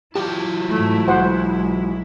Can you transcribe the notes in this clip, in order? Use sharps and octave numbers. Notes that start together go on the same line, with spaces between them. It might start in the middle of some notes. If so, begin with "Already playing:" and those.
F#3 E4 F4 G4 A5
G#2 A3
B1 G#3 F#4 C5 F#5